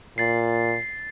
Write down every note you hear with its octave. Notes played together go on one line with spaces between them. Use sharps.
A#2 A6 C7